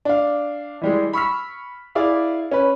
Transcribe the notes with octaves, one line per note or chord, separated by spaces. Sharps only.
D4 F5
E3 G3 G#3
B5 C#6 E6 F6 B6
E4 G#4 D5 F5
C#4 B4